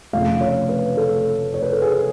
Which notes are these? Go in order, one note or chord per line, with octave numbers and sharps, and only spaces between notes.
F1 F2 C#3 F3 A3 F5
C#5
B4
A4
C#5
B4
A4
G#4